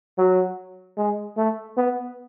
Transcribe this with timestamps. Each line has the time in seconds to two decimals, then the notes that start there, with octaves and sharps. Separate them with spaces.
0.18 F#3
0.97 G#3
1.37 A3
1.77 B3